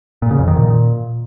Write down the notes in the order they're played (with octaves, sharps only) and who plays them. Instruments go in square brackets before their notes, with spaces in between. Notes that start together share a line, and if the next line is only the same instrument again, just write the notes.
[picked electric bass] A#2
C#3
F2
D#3
A#2